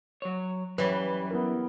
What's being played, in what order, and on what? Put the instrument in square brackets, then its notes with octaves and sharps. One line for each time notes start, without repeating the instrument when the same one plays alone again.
[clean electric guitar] F#3 C#5
[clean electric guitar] F#2 [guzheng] E3 G3 [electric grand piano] B4 C#5
[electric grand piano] B3 E4 A#4